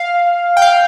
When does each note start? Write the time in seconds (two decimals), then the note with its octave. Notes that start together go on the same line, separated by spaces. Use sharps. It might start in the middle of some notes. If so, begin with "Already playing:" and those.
Already playing: F5
0.57 G5
0.62 F5